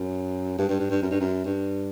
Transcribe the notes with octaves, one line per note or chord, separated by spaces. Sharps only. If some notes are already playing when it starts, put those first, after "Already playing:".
Already playing: F#2
G2
G2
G2
G2
F#2
G2
F#2
G2